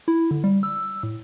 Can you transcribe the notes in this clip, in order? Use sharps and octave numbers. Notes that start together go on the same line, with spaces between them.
E4
D3
G3
E6
A2